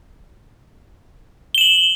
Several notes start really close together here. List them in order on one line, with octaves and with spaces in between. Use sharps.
G7 E7 F#7